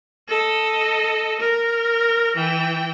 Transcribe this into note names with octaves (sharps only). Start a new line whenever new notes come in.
A4 D#5
A#4
E3 G5